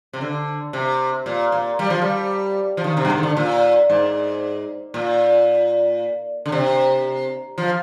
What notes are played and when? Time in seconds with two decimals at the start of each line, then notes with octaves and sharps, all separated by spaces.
0.13 C3
0.21 D3
0.73 C3
1.26 A#2
1.52 A#2
1.79 G3
1.90 F3
2.01 G3
2.77 F3
2.84 D#3
2.97 C3
3.05 G2
3.10 G#2
3.18 D#3
3.23 D3
3.37 A#2
3.90 G#2
4.94 A#2
6.46 D3
6.52 C3
7.58 F3